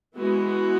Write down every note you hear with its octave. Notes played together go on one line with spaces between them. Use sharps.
E3 G#3 B3 F#4